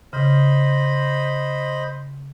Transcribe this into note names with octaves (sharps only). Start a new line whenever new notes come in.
C#3 C5 D#5 B5